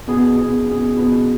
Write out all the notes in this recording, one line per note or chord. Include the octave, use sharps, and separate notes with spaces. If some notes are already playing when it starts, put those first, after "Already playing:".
B2 B3 G#4
B2 B3 G#4
B2 B3 G#4
B2 B3 G#4